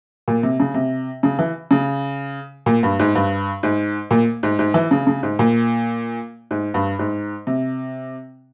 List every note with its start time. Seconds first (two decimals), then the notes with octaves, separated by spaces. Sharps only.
0.28 A#2
0.43 C3
0.60 C#3
0.74 C3
1.23 C#3
1.39 E3
1.71 C#3
2.66 A#2
2.83 G2
2.99 G#2
3.15 G2
3.63 G#2
4.11 A#2
4.43 G#2
4.59 G#2
4.74 E3
4.91 C#3
5.07 C#3
5.23 G#2
5.39 A#2
6.51 G#2
6.74 G2
6.99 G#2
7.47 C3